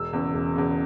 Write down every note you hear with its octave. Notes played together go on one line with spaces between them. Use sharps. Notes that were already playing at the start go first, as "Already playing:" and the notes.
Already playing: E1 E6
E2 C#3
E1
E2 C#3